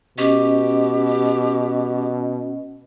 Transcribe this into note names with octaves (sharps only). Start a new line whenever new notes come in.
B2 C#4 G4 D#5